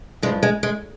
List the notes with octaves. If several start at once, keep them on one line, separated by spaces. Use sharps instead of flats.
G2 F3 G#3
G#3
G#3